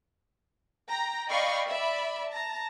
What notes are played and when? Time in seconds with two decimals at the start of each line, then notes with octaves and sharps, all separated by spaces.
0.89 G5 A#5
1.30 D5 D#5 F5 G5 B5 C#6
1.67 D5 E5 B5
2.29 A5 A#5